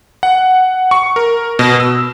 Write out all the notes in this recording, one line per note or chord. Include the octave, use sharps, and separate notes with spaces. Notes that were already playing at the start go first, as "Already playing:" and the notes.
F#5
C#6
A#4
B2
E6